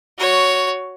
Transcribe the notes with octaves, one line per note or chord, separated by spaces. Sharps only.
F#4 C#5